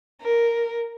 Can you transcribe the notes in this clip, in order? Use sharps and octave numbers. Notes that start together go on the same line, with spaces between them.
A#4